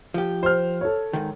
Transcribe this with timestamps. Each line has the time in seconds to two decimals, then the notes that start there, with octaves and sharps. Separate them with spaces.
0.14 F3 G4
0.43 C5 F6
0.81 A4 C#5
1.13 G#2 D#3